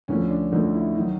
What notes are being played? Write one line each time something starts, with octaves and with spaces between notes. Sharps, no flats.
D2 D3 F3 C#4
D4
D2 D3 F3 D#4
E4
D#3 F#3 D#4